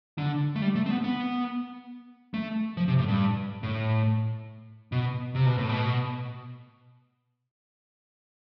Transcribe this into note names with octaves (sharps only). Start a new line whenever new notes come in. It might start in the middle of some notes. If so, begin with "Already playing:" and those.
D3
A3
G3
A3
C4
B3
B3
A3
F3
C3
A2
G2
A2
B2
C3
B2
A2
B2